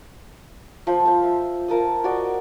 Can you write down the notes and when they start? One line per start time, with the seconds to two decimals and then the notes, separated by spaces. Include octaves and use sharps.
0.87 F3 C5
1.05 C5 F5
1.24 E5
1.68 F4 A#4 A5 D#6
2.04 F#4 D5 D#5